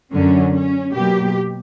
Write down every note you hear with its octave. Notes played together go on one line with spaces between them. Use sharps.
F#2 D3 F#3 C#4
C#4
B2 F#3 A#3 G4